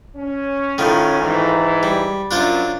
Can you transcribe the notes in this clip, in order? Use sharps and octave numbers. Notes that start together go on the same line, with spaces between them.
C#4
A2 D#3 F3
G#2 E3
G3
F#2 D4 F4 C5